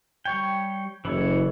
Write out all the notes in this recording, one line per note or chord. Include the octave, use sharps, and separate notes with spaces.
G3 C#5 G5
F#1 E3 A4 C#5